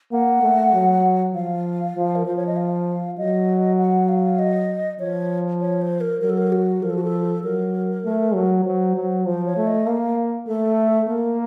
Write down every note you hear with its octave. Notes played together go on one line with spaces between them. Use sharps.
A#3 F#5
A3
F#3
F3 F5
F3
A#4
F3 C5
C#5
D#5
F5
F#3 D#5
F#5
F5
D#5
F3 C#5
C#5
C5
A#4
F#3 A#4
A4
A#4
F#4
F3 A#4
A4
F#4
A4
F#3 A#4
A3
F#3
F#3 C5
F#3
F3 C5
C#5
A3
D#5
A#3 F5
A3 A4
A#3 A#4